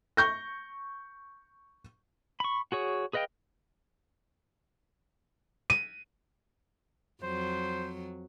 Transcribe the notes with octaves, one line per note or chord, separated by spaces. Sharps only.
C#6 G6 A#6
B5 C#6
F#4 G#4 C#5
G#4 B4 D#5 F5 G5
D#7
F2 F#3 C5